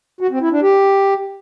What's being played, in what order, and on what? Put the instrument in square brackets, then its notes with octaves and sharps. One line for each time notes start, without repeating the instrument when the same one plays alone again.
[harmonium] F#4
C4
E4
D4
G4